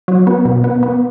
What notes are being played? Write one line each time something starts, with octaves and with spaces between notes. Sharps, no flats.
F#3
B3
B2
B3
B3